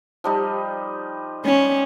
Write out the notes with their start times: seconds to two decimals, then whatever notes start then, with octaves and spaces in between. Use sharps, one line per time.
0.24 F3 G3 D#4
1.45 C#4